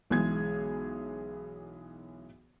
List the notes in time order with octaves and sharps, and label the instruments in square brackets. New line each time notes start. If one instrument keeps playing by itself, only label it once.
[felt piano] B1 E3 G#3 G#4 G#6